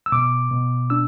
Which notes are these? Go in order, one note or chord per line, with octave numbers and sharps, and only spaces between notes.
E6
B2 D6
B2
D4 E6